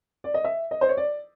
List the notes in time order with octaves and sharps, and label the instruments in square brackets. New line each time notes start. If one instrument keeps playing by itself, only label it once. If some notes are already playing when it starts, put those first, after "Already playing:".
[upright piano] D5
D#5
E5
D#5
C5
C#5
D5